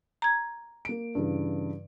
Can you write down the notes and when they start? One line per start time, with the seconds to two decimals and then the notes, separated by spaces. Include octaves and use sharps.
0.22 A#5 G#6
0.85 A#3 D7
1.15 G2 C#3 E3